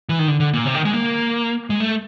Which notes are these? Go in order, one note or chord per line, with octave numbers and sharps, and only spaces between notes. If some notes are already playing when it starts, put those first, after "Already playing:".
E3
D#3
D3
D3
A#2
C3
D#3
G#3
A#3
G#3
A3